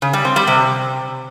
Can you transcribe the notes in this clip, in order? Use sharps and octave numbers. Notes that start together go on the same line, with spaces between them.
C#3
G3
C4
G3
C3